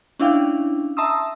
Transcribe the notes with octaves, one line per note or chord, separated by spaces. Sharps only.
C#4 D4 E4 F5 G5
E5 A5 A#5 C6 D#6 E6